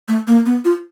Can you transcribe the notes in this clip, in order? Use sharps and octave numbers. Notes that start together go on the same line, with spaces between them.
A3
A#3
B3
F4